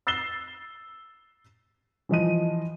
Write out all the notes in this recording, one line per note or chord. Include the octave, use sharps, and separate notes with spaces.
E6 A6 C7 E7 G7
E3 F3 D#5 D#7